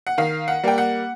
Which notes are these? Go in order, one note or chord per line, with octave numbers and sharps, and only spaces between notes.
F#5
D#3 F5
F#5
G3 A#3 G5
F#5